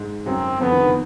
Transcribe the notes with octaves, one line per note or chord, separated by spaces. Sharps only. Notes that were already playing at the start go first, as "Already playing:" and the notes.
Already playing: G#2 G#3
F#2 F#3 C4
F2 F3 B3
D#3
D#3